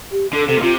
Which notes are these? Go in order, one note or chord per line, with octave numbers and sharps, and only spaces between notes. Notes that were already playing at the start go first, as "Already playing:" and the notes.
G4
D3 A4
C3 A4
A#2
C3 F4